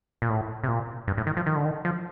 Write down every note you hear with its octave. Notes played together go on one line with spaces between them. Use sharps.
A#2
A2
C3
A#2
G2
A2
D#3
F3
D#3
D3
D#3
F3